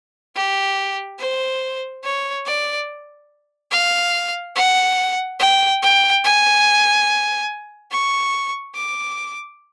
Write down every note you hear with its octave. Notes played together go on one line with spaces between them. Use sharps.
G4
C5
C#5
D5
F5
F#5
G5
G5
G#5
C#6
D6